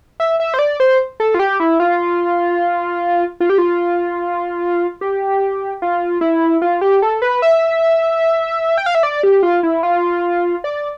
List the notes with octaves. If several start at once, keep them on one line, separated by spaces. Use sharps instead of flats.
E5
E5
C5
D5
C5
A4
F4
G4
E4
F4
F4
G4
F4
G4
F4
E4
F4
G4
A4
B4
E5
G5
F5
E5
D5
G4
F4
E4
F4
D5